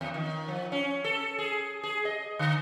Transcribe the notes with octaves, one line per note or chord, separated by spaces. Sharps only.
E2
D#3
F3
C#4
A4
G#4
G#4
D#5
D3